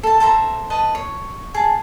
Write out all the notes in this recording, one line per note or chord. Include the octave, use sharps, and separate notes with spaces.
A4 A5
A4 C5 E5 A#5
B4 D#5 A5
C#5
G#4 A5